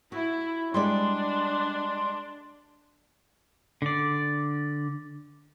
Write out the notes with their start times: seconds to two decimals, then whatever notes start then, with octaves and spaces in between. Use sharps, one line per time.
0.12 E4 F#4
0.74 G3 G#3 D4 D5 C6
3.82 D3 D5